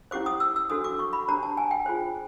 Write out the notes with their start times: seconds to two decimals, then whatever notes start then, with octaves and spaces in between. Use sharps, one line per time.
0.11 C#4 E4 G4 C5 D6
0.26 D#6
0.40 E6
0.56 E6
0.70 D4 F#4 A4 C5 D#6
0.84 D6
0.99 C#6
1.13 B5
1.28 D4 G4 C5 A#5
1.43 A5
1.57 G#5
1.71 G5
1.86 F4 G#4 C5